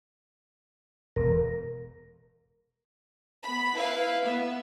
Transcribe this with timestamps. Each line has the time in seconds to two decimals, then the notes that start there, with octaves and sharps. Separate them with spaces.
1.16 E1 A#4
3.43 B3 B5
3.74 E4 B4 F5
4.25 B3 E5